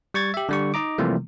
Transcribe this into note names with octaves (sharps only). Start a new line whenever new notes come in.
G3 C#6 G#6 A6
G4 E5
D3 G3 C#6
D#4 D#5 A#5 D6
C3 E3 F3 G3 A3 A#3